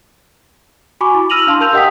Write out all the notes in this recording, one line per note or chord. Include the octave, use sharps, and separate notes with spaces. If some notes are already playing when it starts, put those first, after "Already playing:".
F#4 G#5 B5 C#6 D6
E4
E6 F6 A#6 D#7 F7 F#7
D4 F5 A5 C6
A#4 A5 E6 G6 F7
G4 D#5 F#5 G5 D#6 B6